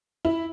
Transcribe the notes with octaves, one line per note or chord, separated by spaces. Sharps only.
E4